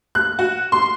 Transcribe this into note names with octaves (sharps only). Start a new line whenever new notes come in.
F#6
F#4
C6